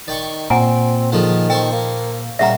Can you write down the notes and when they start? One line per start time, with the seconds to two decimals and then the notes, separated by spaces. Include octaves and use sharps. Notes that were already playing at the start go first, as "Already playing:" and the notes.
0.08 D#3 D5 G5 C#6
0.50 A#2 C4 F#5 G#5 A#5
1.12 D3 D#3 F3 G#3
1.50 A4 C5 G5 C#6
1.72 A#3
2.39 A#2 C#3 G3 E5 F#5 A#5